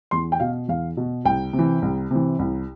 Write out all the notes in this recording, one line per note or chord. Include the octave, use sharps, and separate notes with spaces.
E2 C6
G5
B2 F5
E2 F5
B2
C2 G5
C3
E3
C2
C3 E3
C2